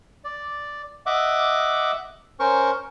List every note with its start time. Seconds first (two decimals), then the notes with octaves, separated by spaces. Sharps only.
0.24 D5
1.06 D#5 E5 F#5 D6
2.40 C#4 A#4 C5 C#6